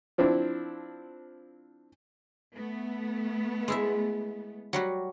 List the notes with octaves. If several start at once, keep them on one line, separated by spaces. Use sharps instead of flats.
F3 C4 D4 E4
A3 B3
G#3 E4 E5
F#3 G3 F#4